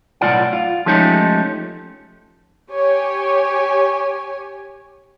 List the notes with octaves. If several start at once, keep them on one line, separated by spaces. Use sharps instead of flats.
B1 A2 E3 F4 D5 F#5
F4
F3 G#3 A3 C#4 D#4 G4
G4 C#5 G#5